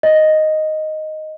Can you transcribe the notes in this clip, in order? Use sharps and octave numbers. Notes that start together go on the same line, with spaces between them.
D#5